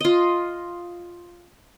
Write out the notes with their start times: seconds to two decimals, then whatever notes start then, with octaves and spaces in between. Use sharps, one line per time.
0.01 F4 D#5